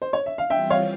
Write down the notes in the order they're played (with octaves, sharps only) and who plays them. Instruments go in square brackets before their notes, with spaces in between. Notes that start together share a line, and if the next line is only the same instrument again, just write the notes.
[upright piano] C5
C#5
E5
F5
[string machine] E3 G3 C4 F4 [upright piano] E5 G5
[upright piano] C#5 F5